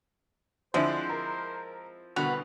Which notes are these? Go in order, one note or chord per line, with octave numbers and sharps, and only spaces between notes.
D3 F3 G#3 C4 D4 E4 C5
A#4
C2 B2 D3 F#4 B4 F7